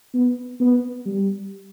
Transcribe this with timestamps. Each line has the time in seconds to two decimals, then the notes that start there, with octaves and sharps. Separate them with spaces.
0.14 B3
0.60 B3
1.06 G3